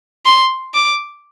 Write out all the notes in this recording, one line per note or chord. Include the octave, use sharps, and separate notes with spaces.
C6
D6